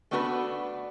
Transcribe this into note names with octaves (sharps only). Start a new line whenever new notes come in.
A3 B3 D4 F#4 A#4 B4